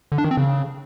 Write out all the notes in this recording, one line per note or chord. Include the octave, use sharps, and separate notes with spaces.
D3
D4
D#3
C4
C#3